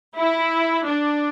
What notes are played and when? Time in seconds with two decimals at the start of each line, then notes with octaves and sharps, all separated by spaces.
0.17 E4
0.83 D4